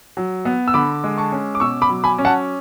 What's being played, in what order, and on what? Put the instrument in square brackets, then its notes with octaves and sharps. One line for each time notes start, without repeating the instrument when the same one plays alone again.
[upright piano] F#3
B3
E6
D3 B5 D6
G#3
A5 C#6
C#4
D6
B2 C#6 E6
B5 D6
F#3
G#5 B5
C#4
F#5 A5